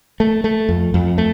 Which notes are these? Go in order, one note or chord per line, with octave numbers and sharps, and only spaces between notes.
A3
A3
F2
F2
A3